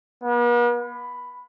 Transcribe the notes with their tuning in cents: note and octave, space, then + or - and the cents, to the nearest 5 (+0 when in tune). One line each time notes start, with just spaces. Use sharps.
B3 -45
B5 +5